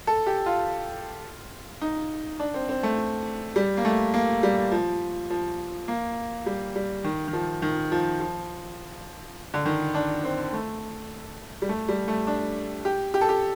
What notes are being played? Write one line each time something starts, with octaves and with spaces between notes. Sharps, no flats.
A4
G4
F4
D#4
D4
C4
C4
A3
G3
A#3
A3
A#3
G3
F3
F3
A#3
G3
G3
D#3
D#3
F3
D#3
F3
F3
D3
D#3
D4
C4
A3
G3
A3
G3
A3
D4
G4
G4
A4
G4